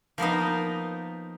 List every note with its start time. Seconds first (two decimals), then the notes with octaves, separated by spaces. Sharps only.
0.18 F3 A#3 B3 D#4